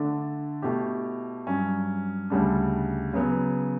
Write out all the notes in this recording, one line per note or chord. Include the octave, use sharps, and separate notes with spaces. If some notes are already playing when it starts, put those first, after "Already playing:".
Already playing: D3 A3 D4 A4
B2 A3 E4 G4
G2 F#3 C#4
D2 C#3 G3 D4
C#3 F#3 B3